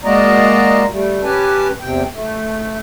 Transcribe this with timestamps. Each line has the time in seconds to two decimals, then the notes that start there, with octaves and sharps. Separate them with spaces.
0.04 G#3 A#3 F#4 D5 D#5 A#5
0.90 G3 A3
1.23 C#4 G4 B4 G#5 A5
1.81 E2 C3 G5
2.13 A3